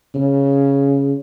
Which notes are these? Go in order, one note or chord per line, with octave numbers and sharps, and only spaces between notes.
C#3